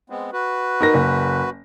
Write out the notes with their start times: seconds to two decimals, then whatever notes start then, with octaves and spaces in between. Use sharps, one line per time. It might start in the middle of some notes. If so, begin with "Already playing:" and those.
0.10 G#3 B3 C4
0.33 F#4 B4
0.81 D#4 A#4 A#6
0.94 F#1